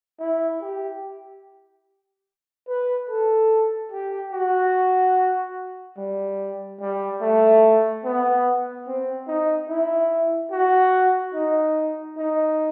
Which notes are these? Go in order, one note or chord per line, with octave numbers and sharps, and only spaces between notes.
E4
G4
B4
A4
G4
F#4
G3
G3
A3
B3
C4
D#4
E4
F#4
D#4
D#4